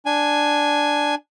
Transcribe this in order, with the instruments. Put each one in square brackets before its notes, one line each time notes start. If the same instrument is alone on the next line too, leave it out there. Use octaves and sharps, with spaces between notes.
[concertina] D4 G#5